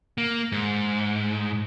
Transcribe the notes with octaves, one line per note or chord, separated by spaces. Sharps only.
A#3
G#2